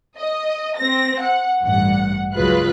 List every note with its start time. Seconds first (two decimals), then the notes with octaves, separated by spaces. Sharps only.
0.18 D#5
0.77 C4 A#6
1.21 F#5
1.63 A1 G2 F#5
2.34 C#2 F#3 G#3 F4 B4 F#6